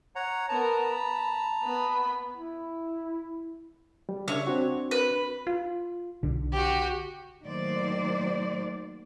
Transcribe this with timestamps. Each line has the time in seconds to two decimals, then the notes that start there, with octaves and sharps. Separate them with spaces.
0.16 C#5 F#5 A#5
0.49 B3 A#4 A5 A#5
0.90 B5
1.63 B3 B5
2.36 E4
4.09 G3
4.28 C#3 D4 C#5 E5
4.47 C4 D4 F#4
4.91 B4
5.47 F4
6.23 B1 D3 D4
6.53 F#4 G4
7.44 D#3 F#3 A3 A#3 C5 D5